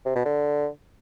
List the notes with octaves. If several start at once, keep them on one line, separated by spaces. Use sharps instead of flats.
C3
B2
D3